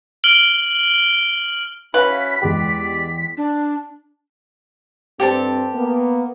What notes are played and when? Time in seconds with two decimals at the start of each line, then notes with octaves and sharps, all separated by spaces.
0.24 F6 D7 F#7 G7
1.94 C#4 E4 F#4 B4 F5 B6
2.42 E2 G#3 G4 D5
3.37 D4
5.20 G2 C4 G4 A4 A5
5.74 A#3 B3